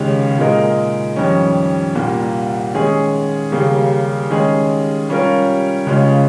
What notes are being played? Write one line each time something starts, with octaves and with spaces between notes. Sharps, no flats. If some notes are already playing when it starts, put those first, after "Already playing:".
Already playing: C#2 C3 D#3 G#3 C#4
A#2 G#3 D#4 A#4
F2 D#3 G3 C#4
C2 A#2 G3 A#3
D#3 G#3 C#4 G#4
D#2 C#3 G3 A#3
D#3 G#3 C#4 G#4
C3 G3 C#4 F4 A#4
C#2 C#3 G#3 C#4 F4